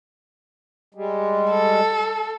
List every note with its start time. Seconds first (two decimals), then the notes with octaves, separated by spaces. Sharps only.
0.94 G3 G#3
1.51 A4